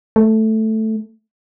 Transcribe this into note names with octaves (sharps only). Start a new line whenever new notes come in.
A3